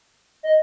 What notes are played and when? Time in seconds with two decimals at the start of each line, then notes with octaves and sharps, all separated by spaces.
0.43 D#5